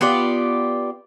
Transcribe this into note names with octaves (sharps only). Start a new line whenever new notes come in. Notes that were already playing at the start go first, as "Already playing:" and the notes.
B3 F4 G4 D5